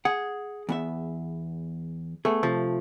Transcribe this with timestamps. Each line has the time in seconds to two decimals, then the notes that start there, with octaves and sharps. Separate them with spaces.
0.05 G#4 F#5
0.69 E2 B3 E5
2.25 A3 B3 G#4
2.43 C3 F3